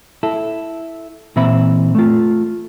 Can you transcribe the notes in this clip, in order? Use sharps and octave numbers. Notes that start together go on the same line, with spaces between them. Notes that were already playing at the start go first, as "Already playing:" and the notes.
E4 A4
A#2 E3 C4 E5 B5
A3 F4